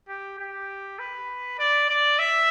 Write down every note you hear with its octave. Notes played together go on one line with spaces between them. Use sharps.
G4
G4
B4
D5
D5
E5